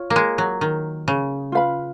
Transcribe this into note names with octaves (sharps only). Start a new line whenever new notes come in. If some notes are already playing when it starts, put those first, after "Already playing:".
Already playing: F4 C#5
A#3
G#3
F#3
D#3
C#3
F4 B4 F5 B5